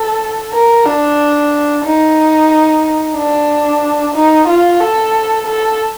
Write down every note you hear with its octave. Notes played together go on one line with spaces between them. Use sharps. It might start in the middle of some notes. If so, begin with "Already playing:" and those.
Already playing: A4
A#4
D4
D#4
D4
D#4
F4
A4
A4